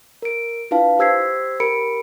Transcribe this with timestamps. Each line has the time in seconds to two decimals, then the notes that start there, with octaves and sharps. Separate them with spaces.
0.22 A#4 D7
0.71 D4 E4 F4 B4 F5 A5
0.99 G4 C5 E6 G#6 B6 C7
1.60 G4 A#4 B5 C#7 D7